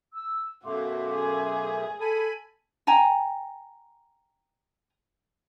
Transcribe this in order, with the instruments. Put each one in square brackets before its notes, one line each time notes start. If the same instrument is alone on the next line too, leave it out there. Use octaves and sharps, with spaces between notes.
[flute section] E6
[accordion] F#2 B2 A3 [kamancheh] F#4 [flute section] F5 C6 D6
[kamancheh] G#4
[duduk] A4 [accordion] G#5 B5
[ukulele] G5 G#5 A#5